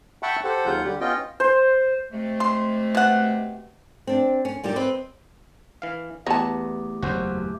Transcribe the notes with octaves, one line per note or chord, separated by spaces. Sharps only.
E5 F#5 G5 A5 B5 C#6
G4 A4 C5 F#5
D#2 C#3 F#3 F4 F#5 G6
D3 G3 G4
B3 C#4 F4 D#5 G5
C5
C3 G#3 A3
C6
B2 F#5
C4 D4
C#4
A#2 G3 D#4 G4
C4 B4 D#5
E3 F5
E2 A3 B3 G4 C#5 A5 A#5
F#1 E2 F#4 C5